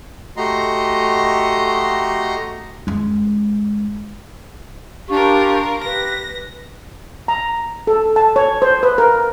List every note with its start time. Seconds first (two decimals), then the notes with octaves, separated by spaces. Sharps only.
0.37 A3 F#4 G4 D#5 A#5 C6
2.87 F#2 G#3
5.09 D4 F4 G4 A#4 C#6
5.84 G4 B4 A#6
7.28 A#5
7.87 A4
8.16 A5
8.36 C#5
8.62 C5
8.83 B4
8.98 A#4